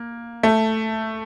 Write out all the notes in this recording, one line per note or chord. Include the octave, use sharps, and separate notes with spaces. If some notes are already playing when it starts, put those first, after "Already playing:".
Already playing: A#3
A3